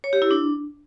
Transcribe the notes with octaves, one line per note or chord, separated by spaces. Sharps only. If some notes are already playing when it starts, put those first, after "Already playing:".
C#5
G4
E4
D4